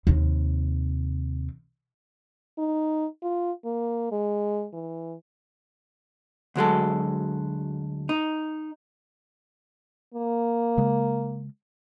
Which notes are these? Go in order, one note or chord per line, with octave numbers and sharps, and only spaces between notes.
D#2 C3
D#4
F4
A#3
G#3
E3
D2 F#3 G#3 A4
D#4
A#3
C#3 G#3